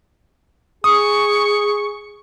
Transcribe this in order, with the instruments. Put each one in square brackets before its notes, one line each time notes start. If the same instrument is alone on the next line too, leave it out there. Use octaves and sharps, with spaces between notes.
[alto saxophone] G#4 [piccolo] C#6 [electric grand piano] D#6